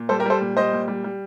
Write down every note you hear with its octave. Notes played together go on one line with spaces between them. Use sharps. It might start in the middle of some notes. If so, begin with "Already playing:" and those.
Already playing: A#2
G3 A4 C5
G4 A#4
G3 A4 C5
A#2
G3 C5 D#5
A#2
G3
G3